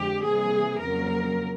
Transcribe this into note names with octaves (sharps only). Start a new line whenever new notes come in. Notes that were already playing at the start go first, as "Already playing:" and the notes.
Already playing: F2 D3 F3 G#3 G4
C3 E3 G3 A#3 G#4
F2 C#3 F#3 A#3 A#4